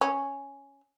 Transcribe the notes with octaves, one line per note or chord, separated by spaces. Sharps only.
C#4